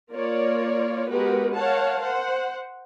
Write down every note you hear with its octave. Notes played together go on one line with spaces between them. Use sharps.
A#3 F4 A#4 C#5 D5
G#3 B3 F#4 G4 A#4 B4
A#4 C#5 F5 F#5 A5
C5 F#5